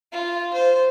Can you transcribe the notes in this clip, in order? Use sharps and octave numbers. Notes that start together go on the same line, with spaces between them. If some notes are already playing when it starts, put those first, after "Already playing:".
F4
C5